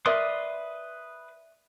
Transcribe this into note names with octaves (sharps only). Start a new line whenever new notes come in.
A#4 B4 D5 E5 C6 D#6